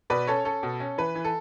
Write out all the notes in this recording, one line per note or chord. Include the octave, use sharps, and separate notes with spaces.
B2 B4 D5
C#4 A4 C#5
C#4 A4
B2
C#4
E3 B4
E3
A4